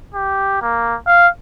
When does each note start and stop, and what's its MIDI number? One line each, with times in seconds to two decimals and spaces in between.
0.14 0.57 67
0.62 0.96 58
1.07 1.28 77